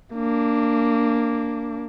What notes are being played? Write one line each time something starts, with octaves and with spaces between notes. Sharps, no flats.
A#3 D4